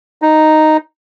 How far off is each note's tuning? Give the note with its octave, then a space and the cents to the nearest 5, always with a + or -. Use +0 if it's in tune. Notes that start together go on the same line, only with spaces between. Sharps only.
D#4 -5